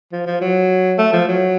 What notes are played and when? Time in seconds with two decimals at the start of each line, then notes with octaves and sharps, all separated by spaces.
0.12 F3
0.26 F3
0.41 F#3
0.98 A3
1.13 F3
1.28 F#3